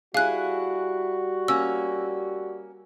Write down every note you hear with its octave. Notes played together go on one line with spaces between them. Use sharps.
G3 E4 F#4 G#4 F5 F#6
A#3 C#4 E6